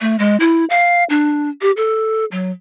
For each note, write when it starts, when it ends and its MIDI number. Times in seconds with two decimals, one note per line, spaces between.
0.01 0.17 57
0.19 0.37 56
0.40 0.65 64
0.70 1.04 77
1.10 1.50 62
1.61 1.71 67
1.77 2.25 69
2.32 2.51 54